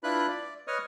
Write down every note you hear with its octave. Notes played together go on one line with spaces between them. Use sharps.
D4 E4 F4 B4 B5 F#6
D5
B4 C#5 D#5 C#6 D#6 F6